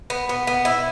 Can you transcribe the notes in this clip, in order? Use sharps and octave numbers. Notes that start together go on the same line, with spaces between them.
B3
B3
B3
E4